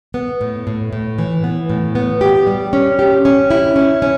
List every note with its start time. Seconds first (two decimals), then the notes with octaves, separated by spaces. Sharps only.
0.14 B3
0.41 A2
0.67 A2
0.93 A2
1.19 E3
1.44 B3
1.70 A2
1.95 B3
2.21 G4
2.47 G3
2.73 C#4
2.99 G4
3.25 C#4
3.50 E4
3.76 C#4
4.02 C#4